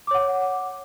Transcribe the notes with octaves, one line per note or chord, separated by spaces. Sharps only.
C#5 F#5 D6